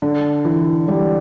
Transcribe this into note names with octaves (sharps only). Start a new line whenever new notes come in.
D3
E3
G3